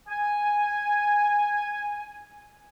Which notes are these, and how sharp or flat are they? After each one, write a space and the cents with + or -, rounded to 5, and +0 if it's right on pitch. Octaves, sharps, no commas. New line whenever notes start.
G#5 -5